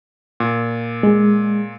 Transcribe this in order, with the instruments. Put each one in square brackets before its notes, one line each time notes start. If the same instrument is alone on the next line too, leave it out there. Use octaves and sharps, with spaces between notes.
[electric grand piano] A#2
[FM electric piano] G#3